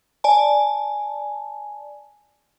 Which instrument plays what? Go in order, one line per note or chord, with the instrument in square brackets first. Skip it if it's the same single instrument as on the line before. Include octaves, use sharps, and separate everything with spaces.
[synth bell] D5 G#5 A5